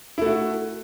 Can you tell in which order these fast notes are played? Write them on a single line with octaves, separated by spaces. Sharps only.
E4 A3 F#4